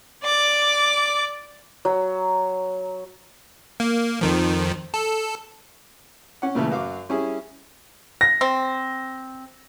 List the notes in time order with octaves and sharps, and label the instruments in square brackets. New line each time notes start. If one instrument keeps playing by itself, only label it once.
[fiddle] D5 D6
[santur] F#3
[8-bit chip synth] A#3
F2 D#3 F3
A4
[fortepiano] C#4 F#5
A#2 C#3 E3 A3
F#2 F#4 F5 D6
G3 C#4 E4 G#4
[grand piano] A#6
[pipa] C4